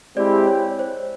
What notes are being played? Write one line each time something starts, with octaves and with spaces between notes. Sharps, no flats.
G#3 C4 E4 G4 D5
C#5
C5